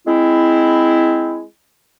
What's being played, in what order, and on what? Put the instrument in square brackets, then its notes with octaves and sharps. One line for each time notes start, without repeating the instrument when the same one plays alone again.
[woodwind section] G#3 C4 E4